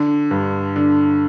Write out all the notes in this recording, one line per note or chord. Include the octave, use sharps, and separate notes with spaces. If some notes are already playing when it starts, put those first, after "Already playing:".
Already playing: D3
G2
D3